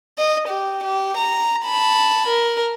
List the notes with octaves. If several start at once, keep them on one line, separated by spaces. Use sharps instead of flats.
D#5
G4
G4
A#5
A5 B5
A#4